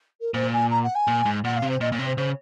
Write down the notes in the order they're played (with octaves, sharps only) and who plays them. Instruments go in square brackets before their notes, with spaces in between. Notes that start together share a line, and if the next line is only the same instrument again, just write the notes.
[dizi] A#4
[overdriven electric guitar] A#2 [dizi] C5
[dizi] G#5
A#5
F#5
G#5
[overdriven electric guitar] A#2
G#2
[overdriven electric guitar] A#2 [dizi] F#5
[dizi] F5
[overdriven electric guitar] C3
[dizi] C5
[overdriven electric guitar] A#2 [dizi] D#5
[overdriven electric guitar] A#2 [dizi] C#5
[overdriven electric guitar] C3
[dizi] C5
[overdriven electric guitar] C#3 [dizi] C5